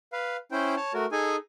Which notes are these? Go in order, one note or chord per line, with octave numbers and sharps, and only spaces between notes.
B4 F5
C#4 E4 C5 G5
C#5 A5
A3 F#4 A#4
D#4 G#4 A4 G#5